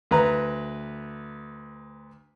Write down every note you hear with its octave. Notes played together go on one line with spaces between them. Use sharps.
D2 B4 A#5